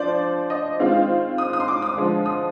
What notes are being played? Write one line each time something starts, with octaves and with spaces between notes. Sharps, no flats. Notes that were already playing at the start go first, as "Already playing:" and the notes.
Already playing: F3 D4 C5 D5
D#5
D#3 G#3 C4 F4 F5
D#6
D#6
C6
D6
D#6
D3 F3 G#3
D#6